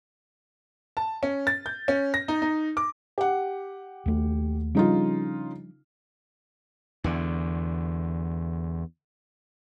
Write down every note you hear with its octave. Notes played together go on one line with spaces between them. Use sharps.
A5
C#4
A6
G6
C#4
A#6
D#4
D#4
D6
G4 F#5
D#2 A3
C#3 F3 G3 D4 D#4 F4
E2 D3